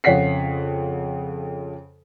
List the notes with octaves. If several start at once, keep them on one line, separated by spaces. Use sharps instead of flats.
F2 C#3 C#5 F#5 B6 C7